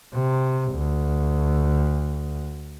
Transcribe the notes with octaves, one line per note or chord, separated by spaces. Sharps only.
C3
D2